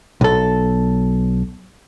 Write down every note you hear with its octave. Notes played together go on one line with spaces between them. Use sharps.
B1 A4